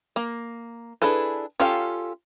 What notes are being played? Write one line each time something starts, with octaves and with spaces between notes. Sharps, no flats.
A#3
D4 E4 G#4 A4 B4
C#4 F4 G4 A4 F5